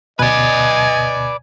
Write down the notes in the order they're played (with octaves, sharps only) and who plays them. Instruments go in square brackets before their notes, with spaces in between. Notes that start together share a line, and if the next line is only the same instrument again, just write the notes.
[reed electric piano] D2 B2 [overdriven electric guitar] B4 D5 [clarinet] D#5 [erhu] G#5